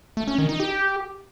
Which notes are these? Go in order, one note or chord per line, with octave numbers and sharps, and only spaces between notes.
A3
C#4
D#3
D#4
G4